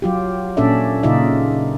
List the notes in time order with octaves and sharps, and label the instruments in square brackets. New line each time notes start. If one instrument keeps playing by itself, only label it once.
[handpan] F#3 F4 G4
A#2 C#4 D4 A4 D5 E5
A#2 C#3 D#4 F4 D5 E5